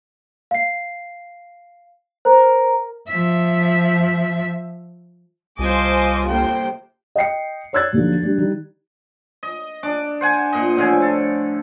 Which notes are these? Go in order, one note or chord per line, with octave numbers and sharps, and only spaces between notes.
F5 C7
A#4 C5
F3 E5
C2 F4 C5 D#5 G#5 A5 D6
G1 C3 A#3 C5 G5
D#5 G5 C7 C#7
C#5 D5 E6 F#6 G#6 A6
D#2 D3 F3 F#3
G3 D4
D#3 G3
D#5
D4 D6
C5 F#5 G#5
A#2 D#5
A2 D3 F3 G#5
A4